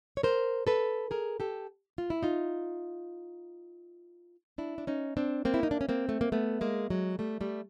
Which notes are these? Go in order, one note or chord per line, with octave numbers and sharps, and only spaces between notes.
C#5
A#4 C5
A4 B4
G#4 A#4
G4 A4
F4
E4
D#4 F4
D4 E4
D4
C#4 D#4
C4 D4
A#3 C4
E4
D#4
D4
C#4
A#3 C4
A3
A#3
A3 B3
G#3 A#3
F#3 G#3
G3 A3
G3 A3